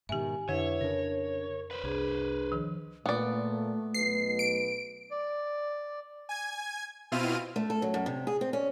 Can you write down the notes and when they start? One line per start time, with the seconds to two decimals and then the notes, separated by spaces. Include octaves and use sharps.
0.09 G#2 B2 D#3 G4 E5 G#5
0.49 F2 D3 E4 B4 C#5 E5
0.81 C#3 D4 A#4
1.71 B4 C5
1.84 C2 D4 G#4
2.52 D#3 F3
3.06 A#2 A3 B3 D5
3.94 B1 B2 B4 C7
4.39 D7
5.11 D5
6.29 G#5 G#6
7.12 B2 C4 E4 F4 F6 D#7
7.56 A3
7.70 A4
7.82 F#3
7.94 F#2
8.06 C3
8.27 G#4
8.41 C4
8.53 C#4